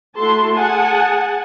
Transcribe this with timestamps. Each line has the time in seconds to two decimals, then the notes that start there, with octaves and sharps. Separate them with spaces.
0.14 A3 E4 F#4 A4 A5 C6
0.54 G#4 F#5 G#5 A5